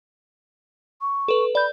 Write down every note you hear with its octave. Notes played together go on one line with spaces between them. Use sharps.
C#6
A4 B4
D5 B5 G6